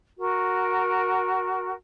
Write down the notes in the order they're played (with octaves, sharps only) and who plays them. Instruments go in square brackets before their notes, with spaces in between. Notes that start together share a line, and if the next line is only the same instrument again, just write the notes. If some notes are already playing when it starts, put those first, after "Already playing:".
[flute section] F#4 A#4